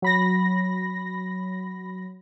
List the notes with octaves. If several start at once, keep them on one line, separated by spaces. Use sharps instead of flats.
F#3 B5 A#6